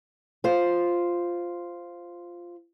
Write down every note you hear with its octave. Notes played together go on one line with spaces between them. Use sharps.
F4 C5